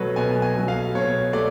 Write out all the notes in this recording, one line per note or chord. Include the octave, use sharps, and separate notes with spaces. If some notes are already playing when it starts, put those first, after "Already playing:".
Already playing: B2 F#3 A3 B4 C#5
B2 G#5
G#5
F#3 A3
F5
B2 C#5
A3 D5